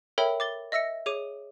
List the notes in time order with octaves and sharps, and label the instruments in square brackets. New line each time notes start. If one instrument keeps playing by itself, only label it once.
[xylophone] A4 A#4 C#5 E5 G5 B5
D6 A6 G7
D#5 E5 E6 A#6 C#7
G#4 C#5 D6 D#7